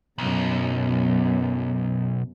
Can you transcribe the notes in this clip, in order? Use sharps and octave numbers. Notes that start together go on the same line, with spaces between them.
B1 F#2 B2